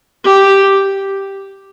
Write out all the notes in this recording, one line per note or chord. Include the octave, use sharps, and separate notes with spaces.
G4